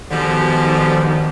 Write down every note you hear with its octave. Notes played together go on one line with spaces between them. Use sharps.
G#2 B2 D3 D#3 F3 G4